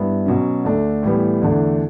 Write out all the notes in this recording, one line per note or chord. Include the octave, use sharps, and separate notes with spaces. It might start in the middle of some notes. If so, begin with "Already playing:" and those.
Already playing: G2 B3 E4
B2 F#3 C#4
D2 D3 A3 D4
A2 E3 G3 B3
E2 D3 A3 D4